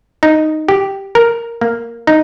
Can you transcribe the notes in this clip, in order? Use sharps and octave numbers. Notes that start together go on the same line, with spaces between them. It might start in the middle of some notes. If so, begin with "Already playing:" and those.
D#4
G4
A#4
A#3
D#4